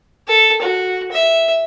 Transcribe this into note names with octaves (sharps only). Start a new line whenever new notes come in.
A4
F#4
E5